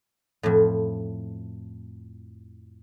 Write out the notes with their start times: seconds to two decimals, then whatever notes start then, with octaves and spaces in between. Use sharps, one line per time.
0.43 F2 A2